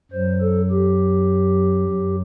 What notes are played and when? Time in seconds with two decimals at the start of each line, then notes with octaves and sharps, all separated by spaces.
0.12 F#2 F#3 C5
0.41 A4
0.71 G4
1.88 F#2 F#3